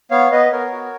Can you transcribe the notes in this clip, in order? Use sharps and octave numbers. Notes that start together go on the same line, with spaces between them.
B3 C#5 F5
B3 B4 D#5
B3 A#4 C#5
F#4